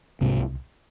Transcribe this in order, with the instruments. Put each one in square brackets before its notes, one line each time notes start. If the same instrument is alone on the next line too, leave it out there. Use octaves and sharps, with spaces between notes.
[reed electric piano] C2 [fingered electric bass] G#2 C3